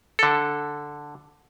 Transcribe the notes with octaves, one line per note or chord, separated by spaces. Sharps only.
D3 A4